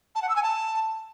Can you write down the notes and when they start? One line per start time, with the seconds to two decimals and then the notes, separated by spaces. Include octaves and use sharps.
0.15 A5
0.22 F#5
0.29 E6
0.36 G#5
0.43 A5